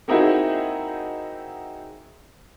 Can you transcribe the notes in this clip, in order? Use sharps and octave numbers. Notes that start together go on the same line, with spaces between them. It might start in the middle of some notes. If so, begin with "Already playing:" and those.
A#3 C4 D#4 E4 F#4 G#4